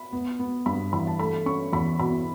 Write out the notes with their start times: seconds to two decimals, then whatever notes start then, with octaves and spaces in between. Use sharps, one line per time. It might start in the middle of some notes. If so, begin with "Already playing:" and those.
Already playing: B5
0.13 B3
0.39 B3
0.66 G2 B5
0.93 E3 B5
1.07 A5
1.19 A3 B5
1.46 C#4 C#6
1.73 E2 B5
1.99 B2 B5